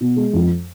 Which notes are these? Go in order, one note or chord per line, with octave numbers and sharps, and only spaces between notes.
B2
G#3
F2